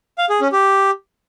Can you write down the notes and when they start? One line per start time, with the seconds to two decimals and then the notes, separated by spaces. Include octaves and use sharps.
0.18 F5
0.29 G#4
0.41 C#4
0.52 G4